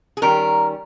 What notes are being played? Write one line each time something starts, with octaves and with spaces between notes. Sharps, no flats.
G#4
D#3 G3 C#4 A#4